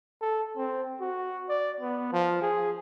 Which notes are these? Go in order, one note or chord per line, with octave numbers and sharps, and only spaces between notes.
A4
C4
F#4
D5
B3
F3
G#4